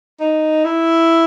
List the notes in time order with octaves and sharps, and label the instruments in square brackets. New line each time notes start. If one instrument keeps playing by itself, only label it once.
[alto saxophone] D#4
E4